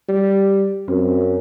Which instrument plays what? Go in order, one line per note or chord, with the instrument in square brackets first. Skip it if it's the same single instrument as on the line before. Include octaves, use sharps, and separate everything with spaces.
[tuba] G3
[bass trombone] F#2 [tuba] C4